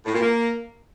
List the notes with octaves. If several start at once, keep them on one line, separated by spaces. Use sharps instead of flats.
A2
A#2
A#3